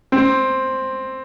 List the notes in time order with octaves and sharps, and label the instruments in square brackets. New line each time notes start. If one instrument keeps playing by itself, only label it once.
[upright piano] C4